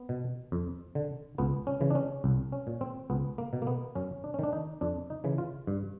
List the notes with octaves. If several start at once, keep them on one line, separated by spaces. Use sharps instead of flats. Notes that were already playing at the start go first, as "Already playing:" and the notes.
Already playing: B3
B2
F2
D3
C#2 B3
C#4
C#3 E3
D4
C#4
C2
C#4
A#2
C4
C#2 B3
A#3
B2
A#3
B3
F#2 C#4
D4
C#4
D#3 D4
D#4
F2 D4
D#4
C#3 E3
F4
G2